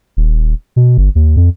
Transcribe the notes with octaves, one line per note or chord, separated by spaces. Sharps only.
D#1
B2
G1
D#2
F2